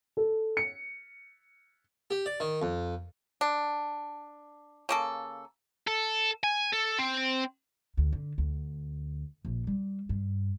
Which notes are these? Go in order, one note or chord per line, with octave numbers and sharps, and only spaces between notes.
A4
C#7
G4
D5
D#3
F2
D4
C#3 A#3 A4
A4
G#5
A4
C4
D2
D3
D2
A#1
G3
G2